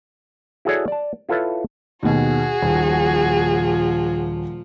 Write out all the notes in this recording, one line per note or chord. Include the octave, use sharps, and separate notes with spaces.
E4 F#4 G#4 A4 C#5 D5
D5 A5
E4 F4 A4 B4 C#5 E5
D#2 B2 F#4 G#4
D#1 A#2 F3